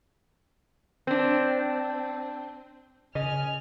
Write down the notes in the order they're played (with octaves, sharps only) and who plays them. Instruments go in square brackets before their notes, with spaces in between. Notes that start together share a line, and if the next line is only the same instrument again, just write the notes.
[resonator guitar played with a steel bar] C4 D4
[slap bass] C#3 [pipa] D#5 [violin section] G#5 F6